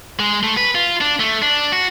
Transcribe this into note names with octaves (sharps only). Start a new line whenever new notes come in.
G#3
A3
B4
F4
D4
A3
D4
F#4